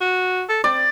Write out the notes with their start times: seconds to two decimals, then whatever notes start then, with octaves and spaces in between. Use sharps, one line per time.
0.01 F#4
0.49 A4
0.64 C4 D5